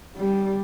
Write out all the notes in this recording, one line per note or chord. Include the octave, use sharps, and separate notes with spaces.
G3